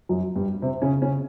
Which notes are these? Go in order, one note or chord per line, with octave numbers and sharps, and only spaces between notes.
F#2 F#3
G2 G3
C3 C4
C#3 C#4
C#3 C#4